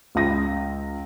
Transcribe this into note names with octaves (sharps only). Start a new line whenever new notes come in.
C#2 A#6